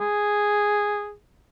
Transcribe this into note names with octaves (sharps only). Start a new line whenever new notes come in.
G#4